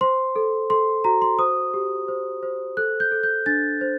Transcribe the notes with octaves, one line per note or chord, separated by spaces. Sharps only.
C5 C6
A4
A4 C6
F#4 A#5
C6
C5 D#6
G4
C5
C5
A4 F#6
G6
A4
G6
D4 A6
C5